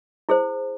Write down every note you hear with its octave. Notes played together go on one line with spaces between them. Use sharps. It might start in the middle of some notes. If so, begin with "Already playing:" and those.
E4 G#4 C5